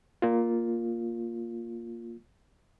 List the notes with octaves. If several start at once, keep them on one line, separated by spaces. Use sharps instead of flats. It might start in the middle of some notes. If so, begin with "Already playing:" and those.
A#3 F4